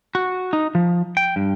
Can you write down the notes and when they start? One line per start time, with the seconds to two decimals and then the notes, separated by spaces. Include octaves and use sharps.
0.15 F#4
0.53 D#4
0.75 F3
1.17 G5
1.36 G2